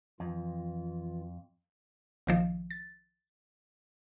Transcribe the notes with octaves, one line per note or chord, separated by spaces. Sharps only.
F2 E3 F4
A#1 D#3 F3
A6